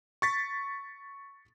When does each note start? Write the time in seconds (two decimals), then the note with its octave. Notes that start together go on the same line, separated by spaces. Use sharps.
0.22 C#6 A6 B6